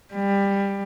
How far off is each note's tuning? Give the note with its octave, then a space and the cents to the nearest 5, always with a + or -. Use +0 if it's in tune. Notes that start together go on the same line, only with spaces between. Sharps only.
G3 +20